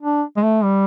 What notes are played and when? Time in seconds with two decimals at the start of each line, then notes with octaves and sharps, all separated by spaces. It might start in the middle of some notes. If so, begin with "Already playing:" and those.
0.01 D4
0.37 G#3
0.43 A3
0.64 G3